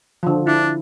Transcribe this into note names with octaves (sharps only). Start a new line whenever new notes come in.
D3 F3
D4 E4